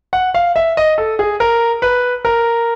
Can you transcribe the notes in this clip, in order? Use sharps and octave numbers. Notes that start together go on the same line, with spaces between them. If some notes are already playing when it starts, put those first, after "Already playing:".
F#5
F5
E5
D#5
A4
G#4
A#4
B4
A#4